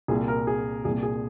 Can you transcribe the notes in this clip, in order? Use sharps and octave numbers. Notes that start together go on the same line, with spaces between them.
C2 A#2 G#4
A#4
G#4
C2 A#2 G#4
G#4